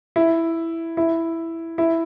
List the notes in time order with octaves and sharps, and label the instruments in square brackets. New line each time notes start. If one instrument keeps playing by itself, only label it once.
[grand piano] E4
E4
E4